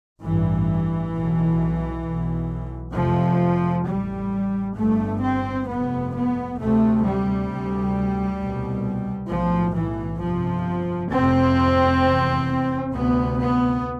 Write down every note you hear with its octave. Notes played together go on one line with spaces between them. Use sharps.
A1 G2 E3
B1 B2
B1 B2
F1 F2 C3 F3
A1 A2 G3
G1 G2 A3
C4
F1 F2 C3 B3
B3
D2 C3 A3
G3
D2 C3
C2 B2
B1 A2 F3
E3
G1 F2 C3 F3
F1 F2 C3 C4
F1 E2 C3
D2 C3 B3
B3